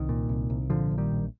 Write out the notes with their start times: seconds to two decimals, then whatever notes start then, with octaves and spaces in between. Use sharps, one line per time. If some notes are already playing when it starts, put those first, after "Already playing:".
Already playing: C2 D#3
0.09 A#2
0.29 C2
0.50 C2
0.70 A#2 D3 F3
0.91 A#1
0.98 D#3 G3
1.12 A#1